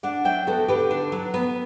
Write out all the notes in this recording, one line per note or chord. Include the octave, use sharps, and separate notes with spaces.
D4 D5 F#5
F#3 E5 G5
B3 F#4 A4
D3 G4 B4
D4
F#3
B3